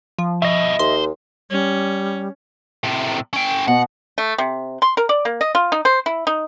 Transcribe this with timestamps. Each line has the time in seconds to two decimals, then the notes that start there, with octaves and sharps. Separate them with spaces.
0.19 F3
0.42 G2 B2 D#5 E5
0.79 D#2 C5 C6
1.51 G3 C#4
2.84 A2 C3
3.33 C#4 G5
3.68 B2 F#5
4.18 A3
4.38 C3
4.82 C6
4.97 A#4
5.09 D5
5.25 A#3
5.41 D#5
5.55 F4
5.72 D#4
5.85 C5
6.06 E4
6.27 D#4